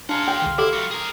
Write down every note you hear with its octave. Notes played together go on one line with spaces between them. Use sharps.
D4 G#4 F5 F#5 A5 A#5 C6
G5
C2 D3 D#3
E4 G4 A4 F#5 D6
G3 F#4
G#4 A#4